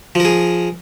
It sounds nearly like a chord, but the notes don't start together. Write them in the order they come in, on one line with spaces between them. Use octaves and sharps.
F3 A#4 G#4